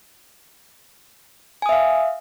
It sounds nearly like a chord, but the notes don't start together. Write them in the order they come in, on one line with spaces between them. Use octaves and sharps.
G#5 D#6 E5 F5